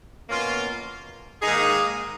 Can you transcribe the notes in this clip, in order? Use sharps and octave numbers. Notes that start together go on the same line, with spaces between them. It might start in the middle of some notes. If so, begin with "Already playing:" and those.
B2 A#3 C#4 F4
G#2 D#3 A#3 D#4 G#4